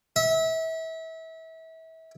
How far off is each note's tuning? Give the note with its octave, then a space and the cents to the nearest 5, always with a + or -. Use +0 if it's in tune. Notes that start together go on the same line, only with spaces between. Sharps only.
E5 -30